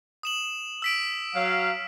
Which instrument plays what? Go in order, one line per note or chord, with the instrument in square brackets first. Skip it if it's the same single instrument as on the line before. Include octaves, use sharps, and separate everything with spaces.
[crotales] D#6 E7 F#7
E6 B6 D7
[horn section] F#3 F5